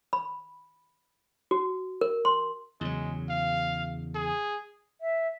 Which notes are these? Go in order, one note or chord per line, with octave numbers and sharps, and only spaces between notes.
B5
F#4
A#4
C6
E2 C#3 F#3 G#3
F5
G#4
E5